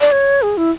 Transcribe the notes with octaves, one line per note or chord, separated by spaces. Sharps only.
D5
C#5
G#4
E4